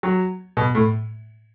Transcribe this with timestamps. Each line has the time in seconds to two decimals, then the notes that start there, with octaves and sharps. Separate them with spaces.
0.03 F#3
0.57 B2
0.75 A2